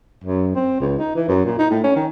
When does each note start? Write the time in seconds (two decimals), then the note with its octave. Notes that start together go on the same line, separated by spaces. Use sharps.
0.24 F#2
0.55 C4
0.80 C#2
0.99 D#4
1.16 E3
1.29 F#2
1.45 A#2
1.59 D#4
1.71 A2
1.84 C#4
1.96 D#3